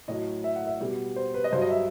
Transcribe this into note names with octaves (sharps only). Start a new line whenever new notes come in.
A2 F#3 D#5
E5
F#5
E5
B2 G3
C5
B4
D#5
G2 F#3 C5
D#5
E5